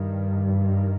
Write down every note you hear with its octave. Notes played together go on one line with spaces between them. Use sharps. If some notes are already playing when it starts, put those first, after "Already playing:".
Already playing: G2 D#3
D#3